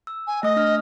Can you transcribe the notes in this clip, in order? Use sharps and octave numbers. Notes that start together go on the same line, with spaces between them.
E6
G#5
A3 D#5 D#6
D4 F6